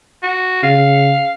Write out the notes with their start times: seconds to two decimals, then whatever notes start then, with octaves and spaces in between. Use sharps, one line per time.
0.23 F#4
0.63 C#3 F5